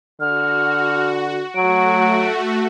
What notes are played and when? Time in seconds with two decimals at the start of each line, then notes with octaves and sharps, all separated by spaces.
0.20 D3 F#4 F6
1.55 F#3 A3 F#4 D7